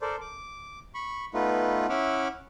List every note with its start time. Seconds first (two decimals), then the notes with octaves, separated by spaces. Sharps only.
0.01 A4 A#4 C5 D5
0.21 D6
0.95 B5 C#6
1.34 A3 B3 D#4 F4 B4
1.89 C#4 E4 E5 F#5 D6 F6